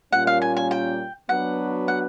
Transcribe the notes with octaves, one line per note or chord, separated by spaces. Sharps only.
A#2 G3 A#3 C#4 F4 F#5
F5
G#5
G#5
G5
F#3 B3 D4 F#4 B4 F#5
F#5